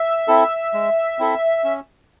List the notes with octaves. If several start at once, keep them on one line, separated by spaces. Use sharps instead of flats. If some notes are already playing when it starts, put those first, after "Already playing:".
Already playing: E5
C4 E4 A4
G#3
C4 E4 A4
C#4